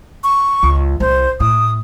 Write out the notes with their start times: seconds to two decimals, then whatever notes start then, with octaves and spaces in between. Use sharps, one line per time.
0.24 C#6
0.63 C#2
1.00 C2 C5
1.40 A2 D#6